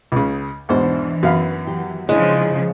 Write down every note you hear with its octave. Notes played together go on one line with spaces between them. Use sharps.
C#2 C#3
E2 G#2 B2 E3 D4 C5
F#2 B3 F5 B5
F#3 G4
C#3 F3 G#3 C#4 D4 E4